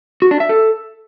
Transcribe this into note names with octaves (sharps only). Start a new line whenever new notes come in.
F#4
D4
E5
A4